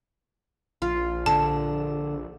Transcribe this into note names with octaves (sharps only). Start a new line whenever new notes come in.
A#1 F4
D3 A5